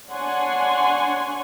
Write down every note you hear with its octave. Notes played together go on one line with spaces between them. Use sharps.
D4 C#5 F#5 G#5 C6